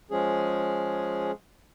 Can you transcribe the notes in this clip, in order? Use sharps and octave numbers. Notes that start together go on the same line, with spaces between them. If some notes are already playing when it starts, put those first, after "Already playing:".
F3 G#3 C#4 G#4